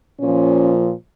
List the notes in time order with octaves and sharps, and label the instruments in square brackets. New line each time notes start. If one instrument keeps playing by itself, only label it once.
[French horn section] A#2 F3 C#4